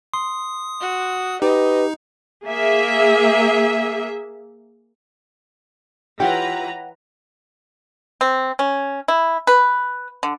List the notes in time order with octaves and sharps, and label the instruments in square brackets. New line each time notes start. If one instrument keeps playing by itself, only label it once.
[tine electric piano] C6 [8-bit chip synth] D#6
[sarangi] F#4
[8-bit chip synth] D#4 [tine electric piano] G4 [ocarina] B4 [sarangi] D#5
[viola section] A#3 G#4 E5
[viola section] E3 B4 A#5 [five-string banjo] F4 G4 [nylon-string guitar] C#5 F#5 G5
[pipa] C4
C#4
E4
B4
D3